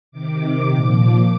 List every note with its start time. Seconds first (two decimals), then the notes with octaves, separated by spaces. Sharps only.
0.11 C3 D#3 D6
0.68 A#2 F3